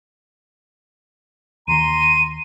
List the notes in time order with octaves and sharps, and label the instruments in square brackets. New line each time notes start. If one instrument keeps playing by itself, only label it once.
[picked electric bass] D#2 D#3 [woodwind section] A#5 C6 [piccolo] D#7